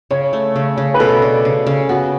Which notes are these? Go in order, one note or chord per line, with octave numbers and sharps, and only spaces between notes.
C#3 C#5
A3
C#3
C#3
B4
B2 A4
D4
C#3
C#3
B3 F#4